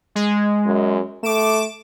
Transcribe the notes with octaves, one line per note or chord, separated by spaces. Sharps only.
G#3
F#2
A3 D6 D7 E7